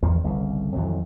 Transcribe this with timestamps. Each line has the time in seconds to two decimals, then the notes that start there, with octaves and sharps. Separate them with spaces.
0.03 G#1 E2 D#3 F3
0.24 G1 C2 C#3
0.74 A1 F2 D#3 F#3